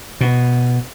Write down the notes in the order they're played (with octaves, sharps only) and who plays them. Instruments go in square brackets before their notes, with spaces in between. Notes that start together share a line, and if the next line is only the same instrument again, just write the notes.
[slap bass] B2